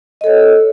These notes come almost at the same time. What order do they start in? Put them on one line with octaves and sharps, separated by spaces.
D#5 A4 C#5